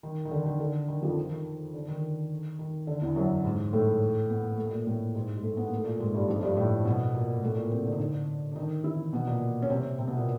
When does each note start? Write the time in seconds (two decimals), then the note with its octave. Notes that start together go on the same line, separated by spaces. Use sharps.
0.03 D#3
0.25 D#3
0.31 D3
0.46 D#3
0.60 D3
0.88 D#3
1.02 F2 F3
1.17 D#3
1.31 D#3
1.74 D3
1.88 D#3
2.59 D#3
2.87 D3
3.02 E2 E3
3.16 F#2 F#3
3.44 G#2 G#3
3.73 A2 A3
4.30 B3
4.44 A#3
4.57 A3
4.71 A#2 A#3
4.86 A2 A3
5.15 G#2 G#3
5.36 G#3
5.43 A2 A3
5.57 B3
5.67 A#3
5.75 A3
5.84 A#2 A#3
6.00 G#2 G#3
6.14 G2 G3
6.28 F2 F3
6.43 G2 G3
6.56 A2 A3
6.85 B2 B3
7.15 A#2 A#3
7.42 A2 A3
7.56 A#2 A#3
7.71 C3 C4
7.85 D3 D4
7.92 D#4
8.00 D3 D4
8.52 D4
8.56 D#3 D#4
8.84 E3 E4
9.13 B2 B3
9.27 A#2 A#3
9.62 C#4
9.70 C3 C4
9.98 C3 C4
10.07 B2 B3
10.17 A#2 A#3